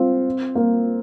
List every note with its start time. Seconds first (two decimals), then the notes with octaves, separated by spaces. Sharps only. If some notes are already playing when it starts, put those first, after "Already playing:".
Already playing: C4 F4
0.55 A#3